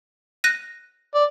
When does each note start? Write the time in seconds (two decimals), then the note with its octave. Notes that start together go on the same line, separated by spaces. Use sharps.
0.44 F#6 A#6 D#7
1.15 D5